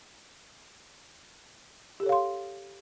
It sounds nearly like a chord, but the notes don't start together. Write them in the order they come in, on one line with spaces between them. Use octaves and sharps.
G4 A4 C#5 F5 C6